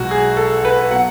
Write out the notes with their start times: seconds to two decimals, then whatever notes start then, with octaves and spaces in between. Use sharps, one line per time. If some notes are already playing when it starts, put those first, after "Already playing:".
Already playing: B1 B2 G#3 F#4
0.11 G#4
0.37 A4
0.65 B4
0.90 B2 F#3 F#5